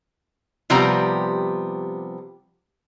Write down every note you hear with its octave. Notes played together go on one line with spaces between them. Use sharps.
C3 F3 G3 B3 G4 A#5